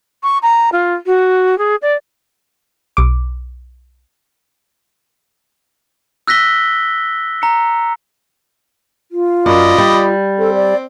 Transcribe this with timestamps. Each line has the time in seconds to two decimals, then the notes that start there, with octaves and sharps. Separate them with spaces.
0.23 C#6
0.43 A#5
0.72 F4
1.06 F#4
1.58 G#4
1.82 D5
2.97 B1 D6
6.27 E6 F#6 A#6 B6 G7
7.42 A#5 C#7
9.12 F4
9.46 F#2 D5 D#5 B5
9.78 G3
10.39 C4 A4
10.55 D5